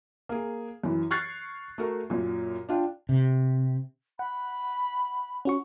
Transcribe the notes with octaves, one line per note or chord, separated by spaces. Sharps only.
A#3 G#4
F#2 E3
C#6 F6 F#6 G#6 A6 C7
A3 F#4 A#4
F#2 A#2
D4 F4 G5
C3
F#5 B5
C#4 F#4 C#6